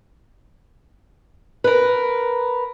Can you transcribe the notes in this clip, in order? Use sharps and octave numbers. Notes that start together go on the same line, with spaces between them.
A#4 B4